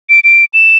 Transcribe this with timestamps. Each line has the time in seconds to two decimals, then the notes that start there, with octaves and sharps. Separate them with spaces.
0.09 D7
0.24 D7
0.54 E7